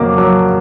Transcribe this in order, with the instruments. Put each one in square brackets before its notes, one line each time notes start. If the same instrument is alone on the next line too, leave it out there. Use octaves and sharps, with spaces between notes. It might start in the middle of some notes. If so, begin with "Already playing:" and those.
Already playing: [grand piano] F2 C#3 F#3 A#3 D6
F#3